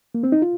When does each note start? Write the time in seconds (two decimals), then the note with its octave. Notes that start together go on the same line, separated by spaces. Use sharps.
0.15 A#3
0.23 C4
0.32 D#4
0.42 F4